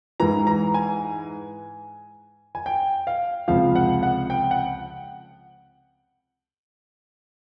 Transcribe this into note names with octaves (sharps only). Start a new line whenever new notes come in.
G#2 E3 A#5
A#5
G#5
G#5
G5
F5
C#2 C3 F3 F5
F#5
F#5
G5
F#5